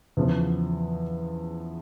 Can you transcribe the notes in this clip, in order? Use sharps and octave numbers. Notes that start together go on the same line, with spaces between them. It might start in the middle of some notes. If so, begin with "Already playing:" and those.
E2 C#3 F3